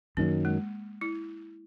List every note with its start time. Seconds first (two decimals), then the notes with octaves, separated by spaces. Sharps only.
0.17 F#2 D#3 F#3 A#3
0.45 G#3
1.01 E4